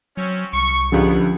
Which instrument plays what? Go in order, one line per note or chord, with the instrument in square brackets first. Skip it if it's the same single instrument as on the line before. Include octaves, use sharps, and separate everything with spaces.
[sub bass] F#3 [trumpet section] C4 C#4
[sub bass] C2 [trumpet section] C#6
[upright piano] C#2 D3 [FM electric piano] F3 G4 [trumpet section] B3